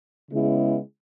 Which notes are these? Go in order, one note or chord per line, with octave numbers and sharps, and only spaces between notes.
C#3 G#3 B3 E4